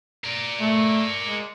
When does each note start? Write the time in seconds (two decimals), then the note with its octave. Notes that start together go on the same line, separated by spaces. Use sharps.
0.24 A#4 D5
0.60 A3
1.25 G#3